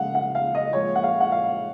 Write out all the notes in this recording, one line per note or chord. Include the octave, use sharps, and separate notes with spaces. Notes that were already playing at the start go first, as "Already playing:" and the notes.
Already playing: C#3 F3 G#3 F5 F#5
F#5
F5
D#5
A#2 F3 G#3 C#5
F#5
F5
F#5
F5